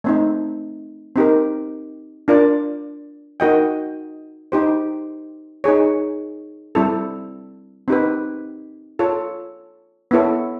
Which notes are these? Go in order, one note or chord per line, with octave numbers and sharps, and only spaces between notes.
A3 C4 D#4
C4 D#4 G4 A#4
D4 F4 A#4 D5
D#4 F#4 A#4 D#5 G5
D#4 G4 C5
D#4 G#4 C#5
G3 C4 E4 A4
C4 D#4 G4 B4
F4 A4 C#5
B3 E4 A4 C#5